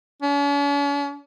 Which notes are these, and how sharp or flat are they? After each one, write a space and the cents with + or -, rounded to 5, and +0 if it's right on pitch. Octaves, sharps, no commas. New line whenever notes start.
C#4 +45